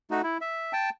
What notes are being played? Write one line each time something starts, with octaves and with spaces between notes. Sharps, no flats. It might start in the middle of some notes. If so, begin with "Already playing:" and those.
A3 D#4 F#4
E4
E5
G5 A5